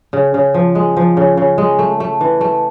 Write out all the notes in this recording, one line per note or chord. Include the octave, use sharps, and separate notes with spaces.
C#3
C#3
F3
G#3
F3
C#3
C#3
G#3
A3
A3
E3
A3